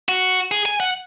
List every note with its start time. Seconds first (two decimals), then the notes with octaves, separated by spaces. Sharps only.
0.09 F#4
0.51 G#4
0.66 G#5
0.80 F#5